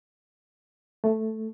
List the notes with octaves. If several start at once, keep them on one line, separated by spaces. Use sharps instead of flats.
A3